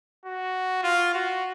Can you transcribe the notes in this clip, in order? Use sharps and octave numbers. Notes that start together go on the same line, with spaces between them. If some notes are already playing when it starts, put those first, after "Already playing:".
F#4
F4
F#4